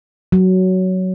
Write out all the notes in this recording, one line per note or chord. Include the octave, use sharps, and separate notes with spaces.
F#3